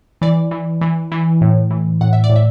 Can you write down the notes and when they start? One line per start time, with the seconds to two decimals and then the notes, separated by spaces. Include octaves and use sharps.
0.22 E3 D5
0.51 E3
0.81 E3
1.12 E3
1.41 A2
1.71 E3
2.01 A2 F#5
2.13 E5
2.24 D5
2.30 A2
2.36 E5